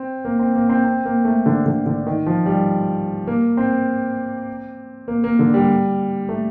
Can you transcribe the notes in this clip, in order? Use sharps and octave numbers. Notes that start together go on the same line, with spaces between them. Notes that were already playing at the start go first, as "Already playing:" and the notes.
Already playing: C4
A#3
C4
A#3
C4
C4
A#3
A3
D3
D3
D3
D#3
F3
G3
A#3
C4
A#3
A#3
D3
G3
A3